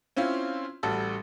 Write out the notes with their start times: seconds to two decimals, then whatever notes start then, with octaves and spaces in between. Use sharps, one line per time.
0.16 C4 C#4 E4 F4
0.83 A1 G3 F#4 A4